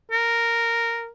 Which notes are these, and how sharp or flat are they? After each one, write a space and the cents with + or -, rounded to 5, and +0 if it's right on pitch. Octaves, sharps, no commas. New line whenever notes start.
A#4 -5